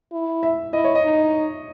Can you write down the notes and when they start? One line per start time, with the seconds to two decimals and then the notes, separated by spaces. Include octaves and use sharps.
0.12 E4
0.43 E5
0.73 E4 D#5
0.84 C#5
0.95 D#5
1.04 D#4